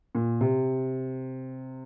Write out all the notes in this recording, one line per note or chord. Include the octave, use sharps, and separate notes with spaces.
A#2
C3